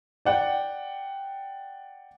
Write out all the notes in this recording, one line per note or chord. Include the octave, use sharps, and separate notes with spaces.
D5 F#5 G5